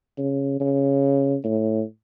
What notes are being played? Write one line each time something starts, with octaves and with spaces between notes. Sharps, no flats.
C#3
C#3
A2